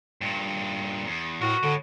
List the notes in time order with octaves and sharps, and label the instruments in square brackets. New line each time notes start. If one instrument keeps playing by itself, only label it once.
[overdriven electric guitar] G2 A#2
E2
[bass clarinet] A2 [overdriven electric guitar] B3 A#4 [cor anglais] F#4
[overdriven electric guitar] A2 [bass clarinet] D3